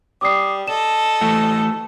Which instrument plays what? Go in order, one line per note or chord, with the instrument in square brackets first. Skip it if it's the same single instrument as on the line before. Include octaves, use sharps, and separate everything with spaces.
[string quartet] G3 [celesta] D6 D#6 C7
[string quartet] A4 D#5 [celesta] E7
[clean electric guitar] E3 A3 F#4